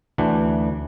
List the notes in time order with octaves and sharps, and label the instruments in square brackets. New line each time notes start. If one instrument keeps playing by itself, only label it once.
[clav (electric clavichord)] D2 E3 D4 F#5